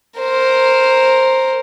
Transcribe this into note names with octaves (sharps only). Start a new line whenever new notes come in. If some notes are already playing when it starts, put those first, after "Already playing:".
A#4 C5